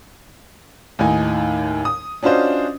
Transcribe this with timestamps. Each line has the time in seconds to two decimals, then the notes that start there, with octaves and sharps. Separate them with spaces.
0.99 D#2 A2 D#4 G#5
1.85 D#6
2.23 C#4 D4 F4 F#4 C5 D#5